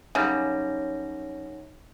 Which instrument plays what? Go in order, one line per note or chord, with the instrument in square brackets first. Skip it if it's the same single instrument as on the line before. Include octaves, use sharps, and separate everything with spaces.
[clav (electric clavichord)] F#2 G3 [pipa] C#3 [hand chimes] D#4 C#5 A#6